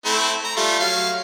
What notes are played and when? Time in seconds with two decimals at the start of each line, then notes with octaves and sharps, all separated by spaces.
0.05 A3 C4 E4
0.44 A#5
0.57 G3 A3 F4
0.80 F#3 F5